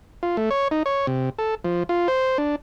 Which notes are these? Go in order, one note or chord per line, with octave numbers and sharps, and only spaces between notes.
F4
A3
C#5
D#4
C#5
C3
A4
F3
F4
C5
D4